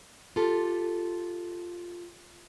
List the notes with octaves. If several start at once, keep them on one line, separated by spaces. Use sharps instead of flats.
F4 G4 A4